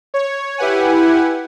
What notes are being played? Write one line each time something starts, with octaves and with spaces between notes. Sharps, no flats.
C#5
E4 G4 B4 F#5 G#5